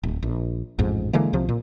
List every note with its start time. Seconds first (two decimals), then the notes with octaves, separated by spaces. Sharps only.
0.03 D1
0.23 A#1
0.79 A1 F2 G#2
1.13 D3 E3 G#3 A#3
1.33 C2 C3 F3
1.49 A#2